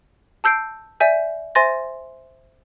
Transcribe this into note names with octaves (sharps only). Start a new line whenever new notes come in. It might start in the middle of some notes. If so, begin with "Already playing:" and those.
A5 E6 G6 C7 D7
D5 E5 G#5 G6
C5 E5 G#5 C6 A6 A#6